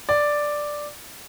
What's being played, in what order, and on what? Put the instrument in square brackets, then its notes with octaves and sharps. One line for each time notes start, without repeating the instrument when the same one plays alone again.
[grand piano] D5